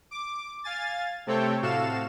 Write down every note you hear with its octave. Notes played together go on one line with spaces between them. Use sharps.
D6
F5 G#5 A6
C3 A3 C4 A4 C#5 G5
A2 C3 F#4 A4 F5 E7